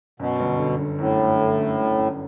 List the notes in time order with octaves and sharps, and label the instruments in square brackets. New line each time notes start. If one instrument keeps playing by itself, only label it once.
[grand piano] F#2 [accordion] B2
[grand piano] G1
D3
D3
[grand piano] F#2 [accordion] A2
[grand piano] G1
D3
F#2
G1
F#2